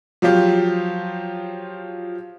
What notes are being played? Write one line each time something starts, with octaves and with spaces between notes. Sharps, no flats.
F3 F#3 F4 G4